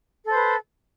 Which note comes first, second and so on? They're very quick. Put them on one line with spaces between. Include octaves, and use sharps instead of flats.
A4 C5 B4